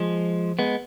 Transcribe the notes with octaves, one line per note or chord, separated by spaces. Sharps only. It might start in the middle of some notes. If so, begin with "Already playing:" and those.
Already playing: F3 G#3
G#3 B3